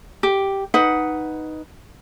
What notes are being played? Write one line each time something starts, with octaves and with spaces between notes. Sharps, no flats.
G4
D#4 B4 F#5